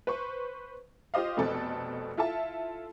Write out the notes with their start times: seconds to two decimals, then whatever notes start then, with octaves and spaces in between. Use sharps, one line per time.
0.07 B4 C5 C#6
1.14 F4 G4 C5 D#5 F5
1.37 F1 B2 C4 A4 A5
2.17 E4 F4 A4 E5 A5